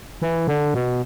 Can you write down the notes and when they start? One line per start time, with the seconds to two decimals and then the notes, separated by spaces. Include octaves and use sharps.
0.22 E3
0.47 D3
0.74 B2